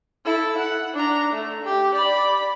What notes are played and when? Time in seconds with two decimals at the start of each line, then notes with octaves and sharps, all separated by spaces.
0.25 E4 A4
0.58 F#5
0.94 D4 A#5
1.33 A3
1.65 G4
1.95 D5 B5